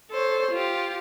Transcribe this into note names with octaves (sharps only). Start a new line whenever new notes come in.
A4 C5 C#5
F4 G4